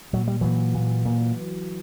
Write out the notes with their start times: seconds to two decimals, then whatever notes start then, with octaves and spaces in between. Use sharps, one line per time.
0.13 A#2 F#3
0.27 G3
0.41 A#2 E3 F#3
0.74 A#2
1.05 A#2